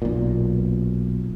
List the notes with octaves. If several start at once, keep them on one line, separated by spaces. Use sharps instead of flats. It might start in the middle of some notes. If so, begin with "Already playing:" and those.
B1 A#2